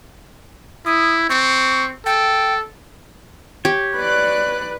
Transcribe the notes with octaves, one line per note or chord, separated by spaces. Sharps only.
E4 D#6
C4 C#6
A4 G5
G4 C#5
B4 D5 F#6